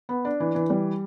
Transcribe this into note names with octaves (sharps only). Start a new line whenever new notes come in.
B3
D4
E3
E3
G3